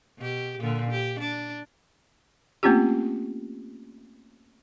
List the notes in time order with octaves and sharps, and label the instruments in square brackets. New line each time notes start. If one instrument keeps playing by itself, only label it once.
[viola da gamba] B2 G4
A#2 D3
G4
D4
[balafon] A3 A#3 C4 C#4 F4 G4